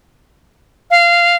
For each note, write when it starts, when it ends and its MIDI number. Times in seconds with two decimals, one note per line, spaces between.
0.91 1.36 77